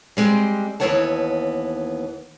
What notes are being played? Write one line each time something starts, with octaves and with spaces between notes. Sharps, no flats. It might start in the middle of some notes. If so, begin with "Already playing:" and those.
G3 G#3 C4
D#2 G#2 E3 B3 C#5 A5